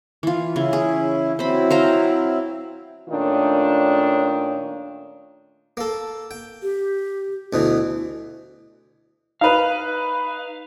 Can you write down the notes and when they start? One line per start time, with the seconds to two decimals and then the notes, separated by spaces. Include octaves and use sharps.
0.23 E3 F4
0.56 C#3 C#4 E4
0.73 G#4
1.39 F#3 C4 E4 C5 B5
1.71 C5 F5 A#5
3.09 A#2 D#3 A3 C#4 D4 F4
5.77 A#3 A4
6.31 G5
6.62 G4
7.53 D2 B2 E3 F#4
9.41 D#4 B4 F5